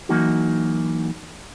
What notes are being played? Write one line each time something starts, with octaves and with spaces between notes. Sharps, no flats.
E3 F#3 A#3 D#4 F#4